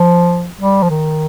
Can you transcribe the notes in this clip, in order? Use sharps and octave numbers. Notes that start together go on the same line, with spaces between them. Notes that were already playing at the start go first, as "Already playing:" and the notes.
Already playing: F3
G3
F3
D#3